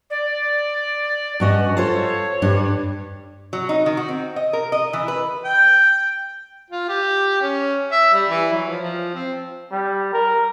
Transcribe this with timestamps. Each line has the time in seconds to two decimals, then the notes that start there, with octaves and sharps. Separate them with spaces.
0.10 D5
1.40 G2 C#4 F#4 D#5
1.77 F4 A4 C5 C#5
2.42 G2 G3 D4
3.53 F#3
3.69 D#4
3.86 D#3
3.97 F#4
4.08 C4
4.36 D#5
4.53 A#4
4.72 D#5
4.93 E3
5.08 B4
5.45 G5
6.70 F4
6.89 G4
7.42 C#4
7.92 E5
8.14 G3
8.29 E3
8.53 F#3
8.68 F3
8.81 F3
9.14 C4
9.72 G3
10.13 A#4